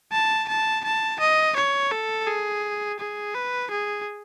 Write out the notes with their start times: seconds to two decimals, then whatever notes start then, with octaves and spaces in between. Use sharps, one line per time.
0.12 A5
0.49 A5
0.84 A5
1.20 D#5
1.56 C#5
1.92 A4
2.27 G#4
3.00 G#4
3.35 B4
3.71 G#4